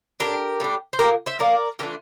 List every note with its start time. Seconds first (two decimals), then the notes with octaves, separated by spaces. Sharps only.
0.20 G3 D4 G4 A#4
0.24 A2
0.60 A2 G3 D4
0.93 C5
0.99 A#2 F3 A#3 G4 A#4
1.26 C5 E5
1.39 A#2 F3 A#3 A#4 D5
1.79 E3 A3 D4 F4 G4 A#4